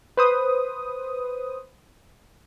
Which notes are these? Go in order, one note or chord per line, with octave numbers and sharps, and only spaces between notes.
B4 C5 D#6